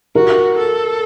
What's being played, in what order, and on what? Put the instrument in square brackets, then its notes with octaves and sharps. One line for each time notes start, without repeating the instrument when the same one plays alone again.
[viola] F#4 [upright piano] A#4
[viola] A4